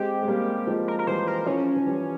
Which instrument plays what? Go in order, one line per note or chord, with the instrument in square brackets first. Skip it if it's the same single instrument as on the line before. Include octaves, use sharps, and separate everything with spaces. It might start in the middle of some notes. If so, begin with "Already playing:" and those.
Already playing: [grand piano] G#3 C4 [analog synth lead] G4
[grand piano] G#3
G3 A#3
F3 G#3
[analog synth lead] A#4
A#4
[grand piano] E3 G3 [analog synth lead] C5
[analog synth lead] A#4
[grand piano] F3 [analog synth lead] C#4
[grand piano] F3
E3 G3